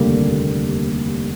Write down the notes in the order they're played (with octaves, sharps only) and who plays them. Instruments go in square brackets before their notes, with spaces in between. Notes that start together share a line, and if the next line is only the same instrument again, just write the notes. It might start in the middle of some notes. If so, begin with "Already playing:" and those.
Already playing: [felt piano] F1 D#2 D3 G3 A#3